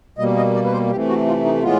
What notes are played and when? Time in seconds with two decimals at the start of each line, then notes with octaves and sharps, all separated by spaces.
0.18 B2 G3 A#3 D#5
0.36 D#5
0.54 D5
0.65 B4
0.73 C5
0.91 C3 E3 A3 G4
1.09 F#4
1.27 F4
1.45 D#4
1.63 A2 E3 G#3 B3 F4